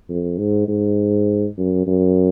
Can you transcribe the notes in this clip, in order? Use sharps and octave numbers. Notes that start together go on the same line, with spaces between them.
F2
G#2
G#2
F#2
F#2